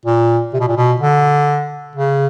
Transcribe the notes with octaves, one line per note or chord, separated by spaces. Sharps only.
A#2
C3
B2
A#2
B2
D3
C#3